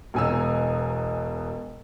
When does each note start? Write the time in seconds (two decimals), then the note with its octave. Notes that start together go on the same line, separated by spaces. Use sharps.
0.14 E1 B2 G#5 A#5 E6